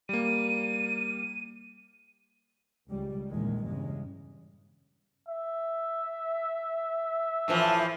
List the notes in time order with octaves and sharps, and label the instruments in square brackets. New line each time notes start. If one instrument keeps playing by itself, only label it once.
[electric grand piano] G3 A#3 [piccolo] D#7
[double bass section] C#2 G3
A#1 E2 D#3 G#3
E2 G2 C#3 G#3
[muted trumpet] E5
[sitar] A2 E3 F3